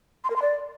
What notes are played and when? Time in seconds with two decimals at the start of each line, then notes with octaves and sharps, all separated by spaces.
0.24 C6
0.30 A#4
0.36 C6
0.42 D5